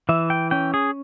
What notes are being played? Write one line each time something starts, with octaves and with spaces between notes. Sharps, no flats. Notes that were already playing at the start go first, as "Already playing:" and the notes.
E3 E5
G5
C#4 G5
G#4